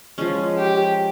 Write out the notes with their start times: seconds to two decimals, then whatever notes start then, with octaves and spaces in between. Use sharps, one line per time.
0.18 F3 G#3 C#4
0.57 G4